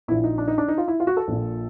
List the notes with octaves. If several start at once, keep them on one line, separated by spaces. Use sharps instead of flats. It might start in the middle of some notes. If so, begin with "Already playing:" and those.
A#1 A#2 E4
D#4
D4
D#4
D4
D#4
F4
E4
F4
F#4
A4
A#1 A#2